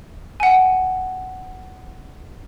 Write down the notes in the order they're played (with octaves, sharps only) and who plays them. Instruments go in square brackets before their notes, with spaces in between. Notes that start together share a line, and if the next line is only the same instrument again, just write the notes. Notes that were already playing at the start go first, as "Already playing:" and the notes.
[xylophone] F#5 G#5